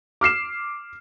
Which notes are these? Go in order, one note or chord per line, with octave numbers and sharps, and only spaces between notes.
D6 F6 C7 E7